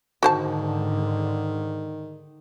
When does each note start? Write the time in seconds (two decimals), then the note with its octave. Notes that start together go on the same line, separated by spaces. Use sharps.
0.23 G#2 D3 D#3 F#4 C5 A5